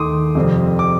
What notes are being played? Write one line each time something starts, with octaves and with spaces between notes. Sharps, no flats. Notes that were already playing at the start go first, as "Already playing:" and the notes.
Already playing: D#2 D#3 A3 D#4 C6 D6 D#6
F2 C3 G3 C4
D6